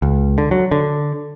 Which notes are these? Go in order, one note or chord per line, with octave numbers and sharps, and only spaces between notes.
C#2
D3
F#3
D3